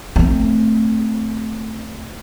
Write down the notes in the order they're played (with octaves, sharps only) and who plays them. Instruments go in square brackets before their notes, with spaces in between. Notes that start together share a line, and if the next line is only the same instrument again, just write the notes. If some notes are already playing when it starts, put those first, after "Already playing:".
[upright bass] A3 C4